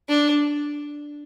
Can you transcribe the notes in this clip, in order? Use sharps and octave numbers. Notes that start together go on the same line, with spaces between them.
D4